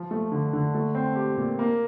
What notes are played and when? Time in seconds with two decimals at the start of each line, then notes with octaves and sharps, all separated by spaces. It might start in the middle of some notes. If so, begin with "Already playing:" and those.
Already playing: F3
0.11 A3
0.32 D3
0.53 D3
0.74 A3
0.95 C4
1.16 G4
1.37 A#2
1.59 A#3